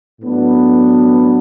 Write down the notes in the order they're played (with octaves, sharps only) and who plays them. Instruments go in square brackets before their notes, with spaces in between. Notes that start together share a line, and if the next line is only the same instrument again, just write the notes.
[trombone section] A2 F#3 B3 D4